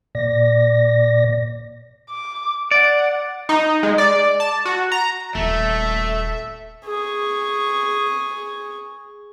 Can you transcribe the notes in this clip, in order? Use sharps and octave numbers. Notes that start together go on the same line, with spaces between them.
A#2 D5 A#6
D6
D5 F#5
D#4
G#3
D5
A5
F#4
A#5
D#1 A3 E5
G#4 C#6